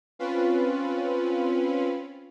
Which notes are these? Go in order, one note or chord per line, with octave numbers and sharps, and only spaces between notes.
C4 C#4 F4 B4